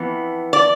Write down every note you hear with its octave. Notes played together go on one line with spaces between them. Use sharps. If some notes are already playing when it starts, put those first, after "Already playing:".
Already playing: F2 E3 B3
D5